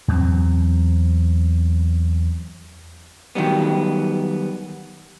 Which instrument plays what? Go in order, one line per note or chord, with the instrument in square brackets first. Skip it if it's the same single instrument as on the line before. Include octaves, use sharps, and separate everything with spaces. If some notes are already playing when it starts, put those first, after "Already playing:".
[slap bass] E2 F#3 C4
[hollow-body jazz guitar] D#3 F#3 G3 B3